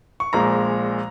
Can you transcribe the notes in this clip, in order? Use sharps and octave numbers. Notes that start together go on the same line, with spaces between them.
C#6
A#1 A#2 G#3 A#5